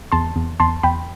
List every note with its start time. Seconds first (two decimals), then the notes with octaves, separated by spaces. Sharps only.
0.12 E2 A5 C6
0.36 E2
0.60 E2 A5 C6
0.83 E2 G5 B5